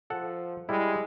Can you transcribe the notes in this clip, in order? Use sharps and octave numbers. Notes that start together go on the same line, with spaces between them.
F3 A4 F#5
G3 G#3 E4